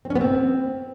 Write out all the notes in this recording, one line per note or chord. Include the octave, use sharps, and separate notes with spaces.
C4
C#4
B3
C4